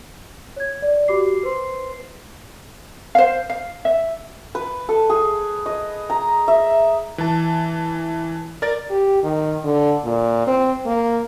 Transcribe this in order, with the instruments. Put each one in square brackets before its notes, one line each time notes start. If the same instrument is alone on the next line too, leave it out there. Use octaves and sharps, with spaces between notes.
[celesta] C#5 G#6
D5
F#4 G4 D6 C7
B4 C5 C6 C7
[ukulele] C5 F5
F5
E5
[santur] B4
A4
G#4
D#5
A#5
E5
[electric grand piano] E3 A5
A#4 D5 A6
[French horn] G4
D#3
D3
A#2
C4
A#3